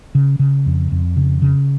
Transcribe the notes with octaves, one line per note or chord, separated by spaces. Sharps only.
C#3
C#3
F2
F2
C#3
C#3